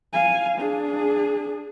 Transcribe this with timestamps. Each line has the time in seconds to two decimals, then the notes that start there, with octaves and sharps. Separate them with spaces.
0.13 F5 G#5
0.58 D4 G#4